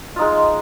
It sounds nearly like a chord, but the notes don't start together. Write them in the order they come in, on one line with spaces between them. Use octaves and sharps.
F4 D#4 G#3